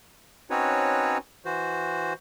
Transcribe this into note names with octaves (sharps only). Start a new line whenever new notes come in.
C4 C#4 D#4 F#4 B4 C#5
E3 F#4 C5